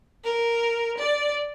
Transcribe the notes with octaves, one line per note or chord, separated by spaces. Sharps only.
A#4
D5